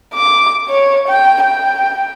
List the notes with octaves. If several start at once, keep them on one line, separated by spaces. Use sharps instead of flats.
D6
C#5
G5
G5